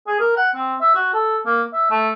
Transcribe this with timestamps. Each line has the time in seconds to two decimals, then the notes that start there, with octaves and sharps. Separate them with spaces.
0.07 G#4
0.20 A#4
0.37 F#5
0.55 C4
0.81 E5
0.95 F#4
1.14 A4
1.46 A#3
1.73 E5
1.90 A3